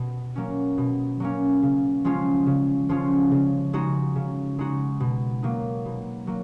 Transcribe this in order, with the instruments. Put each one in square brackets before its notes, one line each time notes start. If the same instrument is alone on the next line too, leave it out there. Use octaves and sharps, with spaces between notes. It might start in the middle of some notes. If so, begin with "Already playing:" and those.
Already playing: [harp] B2
F#3 A#3 C#4
B2
F#3 A#3 C#4
C#3
F3 G#3 C#4 F4
C#3
F3 G#3 C#4 F4
C#3
G#3 D#4 F#4
C#3
G#3 D#4 F#4
B2
F#3 A#3 D#4
B2
F#3 A#3